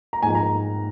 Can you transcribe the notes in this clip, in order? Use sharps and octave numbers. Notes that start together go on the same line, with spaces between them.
A#5
G#2 F3 G#5
A#5